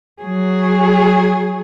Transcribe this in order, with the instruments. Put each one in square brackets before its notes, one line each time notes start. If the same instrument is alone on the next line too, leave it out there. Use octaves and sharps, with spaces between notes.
[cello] F#3 G#4